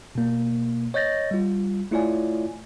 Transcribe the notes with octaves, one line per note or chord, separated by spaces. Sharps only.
B2 A#3
C#5 D#5 G6 A6 A#6
G3 F4
A3 E4 F4 C#5 D5 G#5